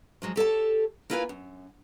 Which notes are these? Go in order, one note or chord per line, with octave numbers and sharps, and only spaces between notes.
F3 F#3 G#3
G4 A4 C#5 A5
A#3 E4 F4 B4 G5 G#5
F#2